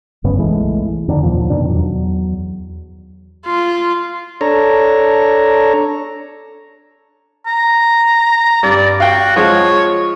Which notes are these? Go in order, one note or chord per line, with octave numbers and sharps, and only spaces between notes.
F1 F#2 C#3 B3
B1 E3 G#3 A3
F2 D3 D#3 D4
D#2 A#2 F3
F2 B2 D#3 D4
E2 F#3
F4
D4 A4 C#5 A#5
A#5
G2 D5
F#4 F5 G5
F3 G#3 F4 C#5